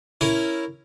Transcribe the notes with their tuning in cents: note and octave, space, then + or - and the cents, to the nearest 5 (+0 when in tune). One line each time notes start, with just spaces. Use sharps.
C#4 +0 E4 +0 A#4 +0